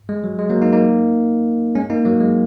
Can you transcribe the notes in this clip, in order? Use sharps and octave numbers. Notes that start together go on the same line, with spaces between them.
G#3
F#3
G#3
F#3 A#3
A#3 D#4
A#3 D#4
G#3 C#4
A#3 D#4
F#3 A#3
G#3